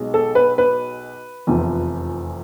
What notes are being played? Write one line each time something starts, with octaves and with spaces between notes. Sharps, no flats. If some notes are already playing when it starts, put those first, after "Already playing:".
Already playing: B1 B2 G#3
A4
B4
B4
F1 E2 C3 F3